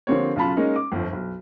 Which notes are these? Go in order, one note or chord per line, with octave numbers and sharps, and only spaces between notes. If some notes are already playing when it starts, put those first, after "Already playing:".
D3 F3 A#3 C4 G4 C#5
B1 C#3 F4 A5 B5
G#3 A#3 C#4 D#4 A#4
D6
G1 F2
B1